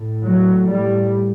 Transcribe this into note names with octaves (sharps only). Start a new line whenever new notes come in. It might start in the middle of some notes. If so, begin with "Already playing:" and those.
Already playing: A2
F#3
G3